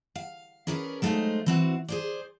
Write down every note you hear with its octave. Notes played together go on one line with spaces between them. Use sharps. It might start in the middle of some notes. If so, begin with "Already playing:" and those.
F5
C#4 G#4 A#4 B4 C#5 D5
F#3 G#3 A3 D#4 C5 F5
E3 C4 F#4
G#4 C5 D5